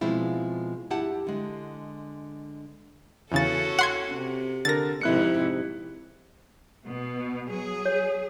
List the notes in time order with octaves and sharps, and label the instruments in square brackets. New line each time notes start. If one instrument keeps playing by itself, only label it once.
[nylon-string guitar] B2 F3 G#3 C4 E4 F4
G2 E4 G4 F#5 A5
D3 G#3
[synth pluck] E2 C#3 A6 [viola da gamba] C#4 F#4 A4
[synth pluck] F#5 C6 G#6
[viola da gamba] C3
[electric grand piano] D3 A#4 [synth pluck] A6 A#6
[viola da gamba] F2 G#2 C3 [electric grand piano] E4 F#6 C#7
[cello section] B2
F#3 G#4
[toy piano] C#5